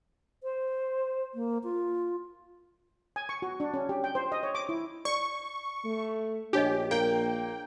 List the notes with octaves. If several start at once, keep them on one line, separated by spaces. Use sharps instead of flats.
C5
A#3
F4
G#5
C#6
F#4
D4
C#4
G4
G5
C5
D#5
C#5
D6
E4
D5 C#6
A3
A#1 D4 G4 C#5 D#5
A#3 G5